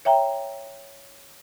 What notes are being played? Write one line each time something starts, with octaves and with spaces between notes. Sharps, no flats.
C#5 E5 G5 A#5